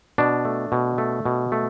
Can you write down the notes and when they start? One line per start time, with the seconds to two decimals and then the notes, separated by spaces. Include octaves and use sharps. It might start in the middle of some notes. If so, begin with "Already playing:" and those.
0.18 B2 D4
0.45 A3
0.72 B2
0.98 A3
1.25 B2
1.52 A3